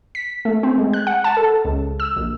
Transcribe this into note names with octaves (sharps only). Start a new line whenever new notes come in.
B6
A3
C4
G#3
F#6
F#5
A5
A4
C#2
E6
A#1